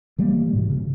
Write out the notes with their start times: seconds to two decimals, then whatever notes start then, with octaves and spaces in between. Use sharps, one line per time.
0.18 E3 G3 A#3
0.53 G#2 B2
0.70 C#3